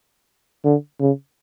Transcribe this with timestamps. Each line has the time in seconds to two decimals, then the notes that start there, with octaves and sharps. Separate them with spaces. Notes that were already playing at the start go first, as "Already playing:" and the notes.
0.64 D3
1.00 C#3